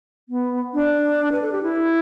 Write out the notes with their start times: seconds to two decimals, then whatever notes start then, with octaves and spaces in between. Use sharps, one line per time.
0.29 B3
0.74 D4
1.32 B4
1.42 A4
1.52 G4
1.63 E4